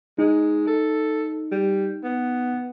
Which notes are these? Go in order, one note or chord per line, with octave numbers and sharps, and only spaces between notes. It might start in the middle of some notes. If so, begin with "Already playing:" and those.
G#3 D#4
A4
G3
B3